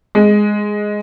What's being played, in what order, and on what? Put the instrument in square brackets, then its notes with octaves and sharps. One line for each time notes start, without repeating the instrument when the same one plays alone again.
[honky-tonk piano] G#3